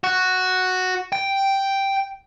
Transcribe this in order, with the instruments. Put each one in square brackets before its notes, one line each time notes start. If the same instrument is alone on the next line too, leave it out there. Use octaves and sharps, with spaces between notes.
[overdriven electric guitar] F#4
G5